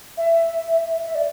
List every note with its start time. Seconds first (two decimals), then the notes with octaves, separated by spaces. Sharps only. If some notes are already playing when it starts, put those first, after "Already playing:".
0.17 E5
1.04 E5
1.15 D5